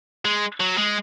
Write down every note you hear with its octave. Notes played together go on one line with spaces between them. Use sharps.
G#3
F#3
G#3